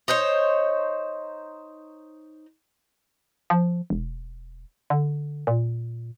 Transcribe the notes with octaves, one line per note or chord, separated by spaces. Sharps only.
D#4 C5 C#5
F3
E1
D3
A#2